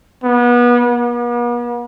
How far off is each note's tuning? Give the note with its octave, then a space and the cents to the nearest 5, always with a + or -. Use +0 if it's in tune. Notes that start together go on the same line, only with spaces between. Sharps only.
B3 -30
B3 -45